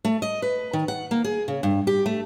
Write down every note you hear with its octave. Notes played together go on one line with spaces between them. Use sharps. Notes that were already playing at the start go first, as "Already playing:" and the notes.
A3
D#5
B4
D#3
F#5
A#3
G#4
C#3
G2
G4
A3